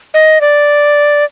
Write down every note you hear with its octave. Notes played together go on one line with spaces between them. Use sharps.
D#5
D5